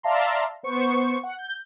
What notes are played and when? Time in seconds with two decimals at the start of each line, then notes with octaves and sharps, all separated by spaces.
0.03 D5 E5 F5 A5 A#5 C6
0.63 B3 C5 C#6
1.23 F#5
1.39 G6